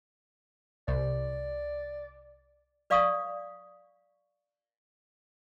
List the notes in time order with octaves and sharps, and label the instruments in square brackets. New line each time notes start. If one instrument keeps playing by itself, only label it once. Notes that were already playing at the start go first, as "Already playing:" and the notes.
[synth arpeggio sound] C2 [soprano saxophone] D5
[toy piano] B4 D5 F5 C#6 D#6